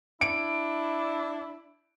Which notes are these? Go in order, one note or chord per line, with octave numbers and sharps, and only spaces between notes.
D4 E4 D7